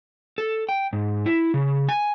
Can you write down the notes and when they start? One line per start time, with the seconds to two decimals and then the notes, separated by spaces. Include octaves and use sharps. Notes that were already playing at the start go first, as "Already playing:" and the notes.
0.38 A4
0.69 G5
0.93 G#2
1.26 E4
1.54 C#3
1.89 G#5